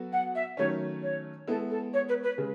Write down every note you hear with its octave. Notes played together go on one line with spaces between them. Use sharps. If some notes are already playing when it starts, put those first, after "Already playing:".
Already playing: F#3 B3 F#4 A4
F#5
E5
D#3 F#3 A3 C#4 C#5
C#5
G#3 B3 E4 A4
A4
C#5
B4
B4
C#3 G#3